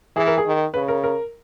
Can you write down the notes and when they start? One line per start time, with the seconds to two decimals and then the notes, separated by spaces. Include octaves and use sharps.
0.16 E3 G#4
0.27 A#4
0.38 G#4
0.46 D#3
0.74 C#3 B4
0.88 A#4
1.04 A#4